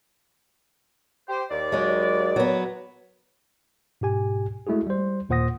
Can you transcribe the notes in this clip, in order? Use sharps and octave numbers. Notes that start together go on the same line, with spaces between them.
G4 C5
D#2 D5
F#3 G#3
F#3 B3
G#2 B2 G4 G#5
G#3 A3 E4 F#4 G#4
G3 C5
D#2 A#2 C5 F#5 D#6 A#6